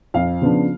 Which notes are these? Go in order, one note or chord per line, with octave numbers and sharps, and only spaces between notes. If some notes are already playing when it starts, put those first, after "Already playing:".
F2 F5
C#3 F3 B3 D4